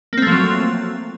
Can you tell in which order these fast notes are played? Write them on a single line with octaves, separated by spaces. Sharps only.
A#3 C4 A3 F3 F#3